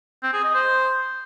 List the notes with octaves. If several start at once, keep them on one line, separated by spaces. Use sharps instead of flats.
C4
G#4
D#5
C5